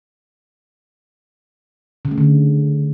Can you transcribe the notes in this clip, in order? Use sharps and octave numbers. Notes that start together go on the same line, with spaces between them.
C#3
A3
D3